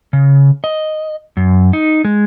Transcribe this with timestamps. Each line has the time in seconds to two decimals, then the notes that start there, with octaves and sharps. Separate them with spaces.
0.13 C#3
0.64 D#5
1.37 F#2
1.73 D#4
2.05 G#3